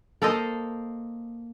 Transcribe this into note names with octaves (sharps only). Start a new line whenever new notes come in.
A#3 A4 C5 D#5